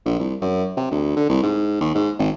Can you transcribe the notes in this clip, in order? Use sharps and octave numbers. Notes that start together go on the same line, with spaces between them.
A#1
C2
F#2
C3
D2
D3
C2
G#2
D#2
G#2
G#1